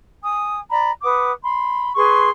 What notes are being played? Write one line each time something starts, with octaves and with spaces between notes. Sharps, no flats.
G#5 D#6
D5 A#5 B5
B4 F#5 D6 D#6
B5 C6
G#4 B4 C6 C#6